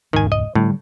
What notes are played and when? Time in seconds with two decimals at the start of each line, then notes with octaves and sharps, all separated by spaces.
0.13 E1 C#2 G#2 D#3 G#5
0.32 D#5
0.55 A2 D3 G3